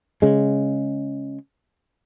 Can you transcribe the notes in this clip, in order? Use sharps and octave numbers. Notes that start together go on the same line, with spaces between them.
C#3 G#3